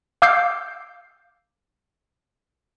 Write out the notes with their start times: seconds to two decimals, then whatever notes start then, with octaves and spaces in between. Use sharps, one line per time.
0.22 F5 D6 E6 G6 C7